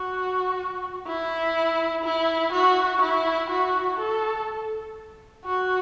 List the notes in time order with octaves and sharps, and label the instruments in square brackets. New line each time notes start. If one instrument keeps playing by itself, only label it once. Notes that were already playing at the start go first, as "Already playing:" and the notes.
Already playing: [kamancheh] F#4
E4
E4
F#4
E4
F#4
A4
F#4